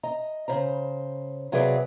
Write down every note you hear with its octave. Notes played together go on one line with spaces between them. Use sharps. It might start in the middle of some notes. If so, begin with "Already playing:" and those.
D#5 A#5
C#3 C5 A#5
C3 F#3 G#4 B4 D5 F5